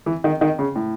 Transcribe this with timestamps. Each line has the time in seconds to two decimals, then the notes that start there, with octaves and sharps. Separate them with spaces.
0.06 E3
0.24 D#3
0.41 D#3
0.59 C#3
0.76 A2